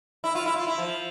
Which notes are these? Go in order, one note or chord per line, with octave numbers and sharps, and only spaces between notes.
E4
F4
E4
F4
E4
F3